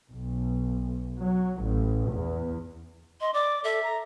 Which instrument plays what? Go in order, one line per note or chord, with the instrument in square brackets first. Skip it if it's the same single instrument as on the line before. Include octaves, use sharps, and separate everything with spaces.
[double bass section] B1
F#3
A1
E2
[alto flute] D#5 [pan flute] C6
[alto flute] D5 [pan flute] D6
[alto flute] A4 [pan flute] E5
[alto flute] A#5